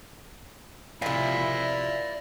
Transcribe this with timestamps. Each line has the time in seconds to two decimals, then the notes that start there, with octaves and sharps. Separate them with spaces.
1.02 C3 F3 E4 D5 F5